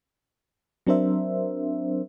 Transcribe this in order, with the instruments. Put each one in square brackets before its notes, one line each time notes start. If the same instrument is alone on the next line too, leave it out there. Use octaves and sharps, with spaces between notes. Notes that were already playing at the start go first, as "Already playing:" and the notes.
[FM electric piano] F#3 C4 D4 A#4 C5 E5